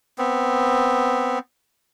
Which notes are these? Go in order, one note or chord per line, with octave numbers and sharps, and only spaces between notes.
B3 C4